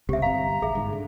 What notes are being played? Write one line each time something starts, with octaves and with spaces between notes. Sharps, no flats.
F1 C#2 C3 G4 E5
G1 C4 F5 A#5
A#1 G#4 E5
G1 G#2
D3